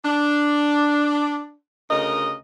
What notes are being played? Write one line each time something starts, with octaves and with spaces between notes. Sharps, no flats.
D4
D2 C#3 A#4 D#5